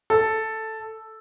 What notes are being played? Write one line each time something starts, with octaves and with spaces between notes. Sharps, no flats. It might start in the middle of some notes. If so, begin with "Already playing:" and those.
A4